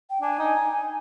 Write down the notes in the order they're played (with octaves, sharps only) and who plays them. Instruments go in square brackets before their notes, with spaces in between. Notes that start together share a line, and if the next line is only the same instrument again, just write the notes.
[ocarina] G5
[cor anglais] D4 [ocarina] G#5
[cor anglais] D#4